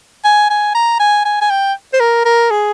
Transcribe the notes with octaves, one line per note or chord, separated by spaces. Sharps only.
G#5
G#5
A#5
G#5
G#5
G#5
G5
C5
A#4
A#4
G#4